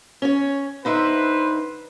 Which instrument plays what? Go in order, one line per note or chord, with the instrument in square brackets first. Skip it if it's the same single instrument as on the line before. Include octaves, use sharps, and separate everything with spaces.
[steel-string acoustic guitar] C#4 C#5
[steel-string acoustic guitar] D3 D#4 E5 [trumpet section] B4 C5